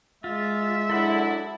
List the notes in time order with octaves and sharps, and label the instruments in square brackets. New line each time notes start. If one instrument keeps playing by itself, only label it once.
[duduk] G#3 [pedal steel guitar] F4 [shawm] E5
[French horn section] F#2 D4 E4 [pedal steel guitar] A4 F#5